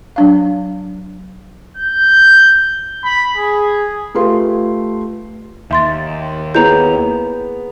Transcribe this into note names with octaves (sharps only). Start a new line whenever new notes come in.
F#3 D4 F5
G6
B5
G#4
A3 F4 G4 B4 C6
D#2 E5 C6 A6
B3 E4 G#4 C#5 A#5 G6 F7